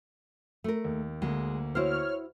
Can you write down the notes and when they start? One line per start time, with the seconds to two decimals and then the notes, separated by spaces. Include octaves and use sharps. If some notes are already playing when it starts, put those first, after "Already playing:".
0.64 A3 A#4
0.85 D#2
1.22 D2 G#3 A#3
1.75 E4 F#4 C5 C#5 F6